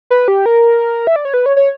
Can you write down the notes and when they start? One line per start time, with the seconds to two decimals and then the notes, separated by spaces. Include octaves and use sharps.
0.10 B4
0.28 G4
0.46 A#4
1.07 E5
1.16 D5
1.25 C#5
1.34 B4
1.46 C#5
1.56 C#5